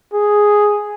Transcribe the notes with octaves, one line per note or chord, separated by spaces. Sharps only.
G#4